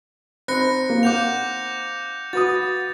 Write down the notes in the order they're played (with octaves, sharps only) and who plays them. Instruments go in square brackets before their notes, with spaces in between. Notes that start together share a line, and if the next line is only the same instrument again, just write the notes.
[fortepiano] C4 D#4 [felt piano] B5 [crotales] F#6 A#6 C#7
[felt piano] A#3
[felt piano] F5 F#5 [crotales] D6 G6 F7
[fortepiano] F#4 B4 D#6 [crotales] A6